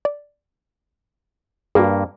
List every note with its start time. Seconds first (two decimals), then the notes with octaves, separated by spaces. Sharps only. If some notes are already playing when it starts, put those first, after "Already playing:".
0.05 D5
1.75 G2 A#3 F#4 G#4